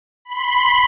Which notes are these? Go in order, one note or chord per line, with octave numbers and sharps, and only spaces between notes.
B5 C6